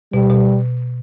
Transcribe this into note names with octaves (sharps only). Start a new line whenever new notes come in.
B2 G3
B2